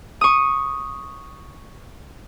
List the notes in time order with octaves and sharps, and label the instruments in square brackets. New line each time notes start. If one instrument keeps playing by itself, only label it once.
[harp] C#6 D#6